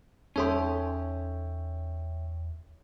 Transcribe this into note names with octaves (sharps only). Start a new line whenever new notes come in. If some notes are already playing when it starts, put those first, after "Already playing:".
E2 C#4 D#4 A4 C#5 E5 G5 C6